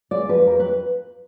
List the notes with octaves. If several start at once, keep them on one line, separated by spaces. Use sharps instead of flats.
G#3 D5
F2 B4
F2 A#4
B4